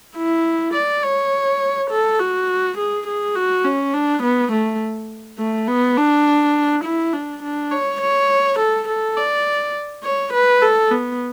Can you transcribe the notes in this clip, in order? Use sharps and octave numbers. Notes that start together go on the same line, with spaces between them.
E4
D5
C#5
A4
F#4
G#4
G#4
F#4
C#4
D4
B3
A3
A3
B3
D4
E4
D4
D4
C#5
C#5
A4
A4
D5
C#5
B4
A4
B3